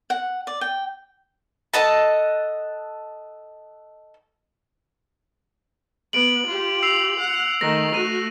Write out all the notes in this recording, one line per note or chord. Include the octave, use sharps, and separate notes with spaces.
F#5
D5
G5
A4 D#5 F#5 A5
B3 D7 F#7
F4 G4
E6 C7 F7
F#5
D#3 A3 A#6
A3 F#4 D#7